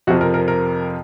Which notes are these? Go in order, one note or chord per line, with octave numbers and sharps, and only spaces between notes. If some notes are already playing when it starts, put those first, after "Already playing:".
F2 C3 F3 F#4
A#4
A#4
A#4